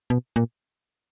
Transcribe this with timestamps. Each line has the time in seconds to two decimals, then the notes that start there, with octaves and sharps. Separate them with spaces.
0.10 B2
0.36 A#2